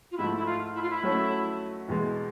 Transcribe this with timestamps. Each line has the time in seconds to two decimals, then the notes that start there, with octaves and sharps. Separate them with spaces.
0.11 F4
0.17 G#2 F3 A3 E4
0.37 E4
0.46 F4
0.75 E4
0.82 F4
0.90 E4
1.03 F#3 A3 C#4
1.88 E2 B2 G#3